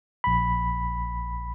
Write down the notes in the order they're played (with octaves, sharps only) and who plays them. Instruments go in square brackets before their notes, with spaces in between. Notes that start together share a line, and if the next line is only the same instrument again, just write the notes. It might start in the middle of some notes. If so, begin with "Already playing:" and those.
[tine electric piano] A#1 B5